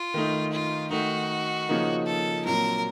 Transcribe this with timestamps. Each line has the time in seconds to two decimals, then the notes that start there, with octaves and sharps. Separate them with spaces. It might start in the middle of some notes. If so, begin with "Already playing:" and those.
Already playing: F4
0.14 D#3 A3 D#4
0.53 F4
0.91 D#3 A3 D#4 F#4
1.69 C#3 F3 A#3 D#4
2.06 A4
2.46 A#2 F#3 C4 A#4